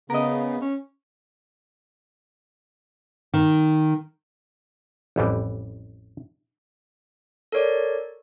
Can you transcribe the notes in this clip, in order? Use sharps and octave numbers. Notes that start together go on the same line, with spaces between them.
C#3 B3 A#4 D#5
C#4
D#3
A1 F2 E3 G3
A4 A#4 C#5 D5